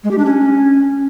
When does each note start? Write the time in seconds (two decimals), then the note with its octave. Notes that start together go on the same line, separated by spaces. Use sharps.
0.04 G#3
0.11 G4
0.18 D4
0.25 C#4